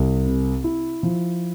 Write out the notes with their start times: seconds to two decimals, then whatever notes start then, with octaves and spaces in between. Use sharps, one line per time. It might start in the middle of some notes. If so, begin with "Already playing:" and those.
Already playing: C2
0.26 C3
0.64 E4
1.03 F3